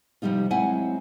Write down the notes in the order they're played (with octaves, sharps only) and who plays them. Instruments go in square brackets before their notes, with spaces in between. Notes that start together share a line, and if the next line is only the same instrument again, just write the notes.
[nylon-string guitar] C3 F3 G3 D#4 F4
F#3 G#3 C4 E4 F#5 G#5